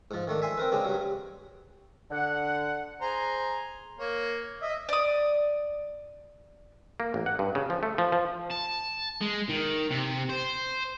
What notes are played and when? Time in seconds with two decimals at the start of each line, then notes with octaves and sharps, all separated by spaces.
0.11 G#2 F3
0.27 D#3 A3 D4
0.42 E5 G#5 C6
0.58 C4 A#4 B4
0.72 C#3 G#3 C4 D4
0.85 G2 F#3
2.11 D3 F#5
3.01 G#4 C5 A#5
3.99 A#3 C#5
4.62 D#5 E5
4.89 D5 D#6
7.00 A#3
7.14 A1
7.26 F#5
7.39 G2
7.55 C#3
7.70 F3
7.83 A3
7.98 F3
8.12 F3
8.51 A5
9.21 G#3
9.49 D#3
9.91 C3
10.29 C5